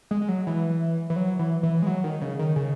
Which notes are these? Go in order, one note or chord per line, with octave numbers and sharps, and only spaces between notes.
G#3
G#3
F#3
E3
E3
F#3
E3
E3
G#3
F#3
D#3
C#3
D#3
C#3